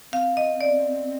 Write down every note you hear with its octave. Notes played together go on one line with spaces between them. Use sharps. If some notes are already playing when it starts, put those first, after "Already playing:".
C4 F5
D#5
D5